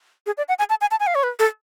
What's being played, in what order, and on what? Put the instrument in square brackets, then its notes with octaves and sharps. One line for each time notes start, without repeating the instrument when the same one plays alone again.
[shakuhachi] G#4
D5
F#5
G#5
A5
G#5
A5
G#5
F5
C#5
B4
A4